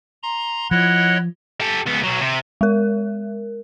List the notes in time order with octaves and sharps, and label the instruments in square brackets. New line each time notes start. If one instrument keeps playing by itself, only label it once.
[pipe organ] A#5 C6
[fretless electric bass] F3 [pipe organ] E4 C#5 D#5 [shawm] F#5
[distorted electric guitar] G4 A4
C#2 B3
B1 F#3
C3
[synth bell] G#3 A#4